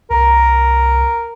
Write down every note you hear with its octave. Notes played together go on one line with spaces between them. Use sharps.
C2 A#4